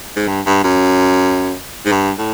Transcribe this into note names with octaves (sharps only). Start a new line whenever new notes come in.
G#2
G2
G2
F#2
G#2
G2
A2